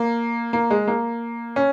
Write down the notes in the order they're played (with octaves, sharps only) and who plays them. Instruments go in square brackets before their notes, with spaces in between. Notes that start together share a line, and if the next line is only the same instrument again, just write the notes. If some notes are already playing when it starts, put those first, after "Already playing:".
Already playing: [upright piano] A#3
A#3
G#3
A#3
C#4